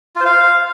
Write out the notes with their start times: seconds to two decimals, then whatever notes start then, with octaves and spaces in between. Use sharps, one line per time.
0.16 F4
0.21 C5
0.26 F5